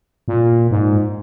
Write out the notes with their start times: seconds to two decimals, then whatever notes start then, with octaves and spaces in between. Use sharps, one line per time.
0.28 A#2
0.71 G#2